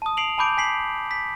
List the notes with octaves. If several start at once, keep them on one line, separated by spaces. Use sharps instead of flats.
A5 D#6
D#6 C7 D7 F7 F#7
G#5 A5 B5 D6 G6 D7
G#5 B6 C7 F#7
B6